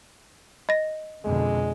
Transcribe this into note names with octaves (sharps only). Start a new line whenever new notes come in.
D#5 A#6
F2 B2 D3 G#3